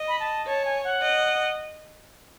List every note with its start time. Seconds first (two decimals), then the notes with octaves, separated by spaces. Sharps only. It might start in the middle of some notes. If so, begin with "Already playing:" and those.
Already playing: D#5
0.08 B5
0.20 A5
0.46 C#5 A5
0.65 G#5
0.84 F#5
1.02 D#5